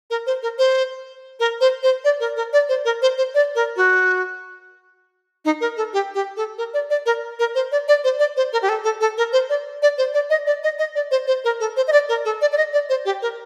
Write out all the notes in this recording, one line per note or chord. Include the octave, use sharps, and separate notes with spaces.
A#4
C5
A#4
C5
A#4
C5
C5
D5
A#4
A#4
D5
C5
A#4
C5
C5
D5
A#4
F#4
D#4
A#4
A4
G4
G4
A4
A#4
D5
D5
A#4
A#4
C5
D5
D5
C5
D5
C5
A#4
G4
A4
A4
A4
A#4
C5
D5
D5
C5
D5
D#5
D5
D#5
D#5
D5
C5
C5
A#4
A4
C5
D#5
D5
A#4
A4
D5
D5
D#5
D5
C5
G4
A#4